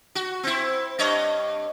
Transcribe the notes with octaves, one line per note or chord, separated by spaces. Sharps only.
F#4
C4 E4
G2 C#5 D#5